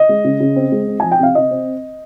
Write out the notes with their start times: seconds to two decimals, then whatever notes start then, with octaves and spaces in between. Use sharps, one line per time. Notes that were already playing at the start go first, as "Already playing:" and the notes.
Already playing: D#5
0.09 G#3
0.24 C#3
0.40 C#3
0.56 C4
0.72 G#3
0.87 C4
1.00 F3 G#5
1.12 G5
1.19 C3 F5
1.35 C3 D#5
1.51 C4